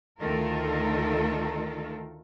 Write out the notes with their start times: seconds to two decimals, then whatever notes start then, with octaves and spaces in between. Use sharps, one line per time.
0.20 D2 D#3 A3 F4 A4 A#4